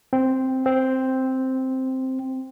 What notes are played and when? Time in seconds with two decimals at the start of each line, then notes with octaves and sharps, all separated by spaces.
0.13 C4
0.66 C4